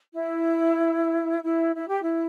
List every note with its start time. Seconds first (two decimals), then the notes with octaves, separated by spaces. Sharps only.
0.13 E4
1.43 E4
1.75 E4
1.88 G4
2.02 E4